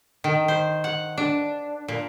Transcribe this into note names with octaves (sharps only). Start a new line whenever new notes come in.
D#3
C5
F#5
D4
A#2